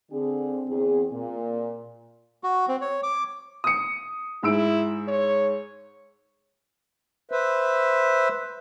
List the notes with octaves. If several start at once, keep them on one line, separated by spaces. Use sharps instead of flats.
D3 C4 D4 G#4
E2 G#4
A#2
F#4
C4
C#5
D6
D#6 C#7
G#2 E4 E6 D7
C#5
B4 C5 E5